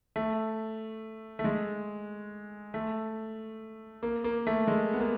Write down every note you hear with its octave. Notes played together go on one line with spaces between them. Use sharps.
A3
A3
G#3
A3
A#3
A#3
A3
G#3
B3
A#3